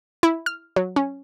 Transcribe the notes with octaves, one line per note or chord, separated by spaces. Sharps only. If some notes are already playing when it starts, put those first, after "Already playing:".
E4
F6
F#3
C#4